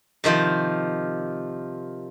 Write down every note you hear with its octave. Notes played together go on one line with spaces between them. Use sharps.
C3 D#3 F3 F4